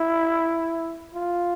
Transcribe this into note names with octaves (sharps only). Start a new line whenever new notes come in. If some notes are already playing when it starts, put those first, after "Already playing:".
Already playing: E4
F4